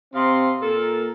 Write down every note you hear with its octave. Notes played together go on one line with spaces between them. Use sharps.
C3 C4 D#5 F5 C6
A#2 A4 A#4